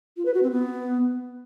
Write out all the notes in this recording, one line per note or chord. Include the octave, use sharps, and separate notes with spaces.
F4
B4
F#4
C4
B3